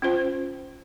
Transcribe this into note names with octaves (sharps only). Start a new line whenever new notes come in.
C#4 F4 C5